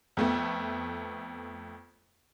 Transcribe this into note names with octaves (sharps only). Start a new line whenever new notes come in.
F2 A3 B3